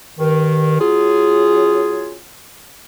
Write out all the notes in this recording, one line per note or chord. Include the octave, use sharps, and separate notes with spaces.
G2 D#3
F#3 C#4 F4 G#4